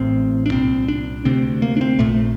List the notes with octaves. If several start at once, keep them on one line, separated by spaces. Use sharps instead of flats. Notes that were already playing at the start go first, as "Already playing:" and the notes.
Already playing: A1 A2 C4
D4
C2 A#2 C4
D4
D2 C3 C4
A#3
D4
C4
A#1 A#2 A3